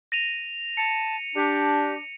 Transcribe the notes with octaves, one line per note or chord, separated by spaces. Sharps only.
A#6 D#7 F7
A5 C#7
D4 G4